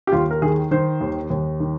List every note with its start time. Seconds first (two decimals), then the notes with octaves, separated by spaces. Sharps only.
0.07 G4
0.12 D#2 F4
0.31 A#4
0.42 D#3 G#4
0.71 D#3 C5
1.01 D#2
1.30 D#2
1.60 D#3